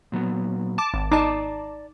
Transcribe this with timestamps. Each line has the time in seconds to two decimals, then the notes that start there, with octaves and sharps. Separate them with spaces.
0.12 A#2 F#3 B3
0.78 A5 D6
0.94 G#1
1.12 D#4 D5 A5 A#5 D6